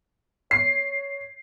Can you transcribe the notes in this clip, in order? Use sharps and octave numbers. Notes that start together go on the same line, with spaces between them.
C#5 C7